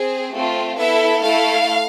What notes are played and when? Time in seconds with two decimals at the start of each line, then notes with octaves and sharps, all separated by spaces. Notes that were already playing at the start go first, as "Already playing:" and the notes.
Already playing: C4 G#4
0.34 A3 C4 F4
0.78 B3 E4 A4 E5
1.22 A3 E4 A4 F5